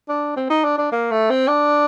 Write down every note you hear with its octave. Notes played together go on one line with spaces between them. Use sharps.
D4
C4
D#4
D4
D4
A#3
A3
C4
D4